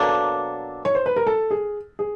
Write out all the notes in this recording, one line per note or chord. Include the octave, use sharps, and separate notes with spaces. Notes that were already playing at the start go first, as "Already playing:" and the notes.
Already playing: B2 F#3 A#3 D4 A4
C#5
C5
B4
A#4
A4
G#4
G#4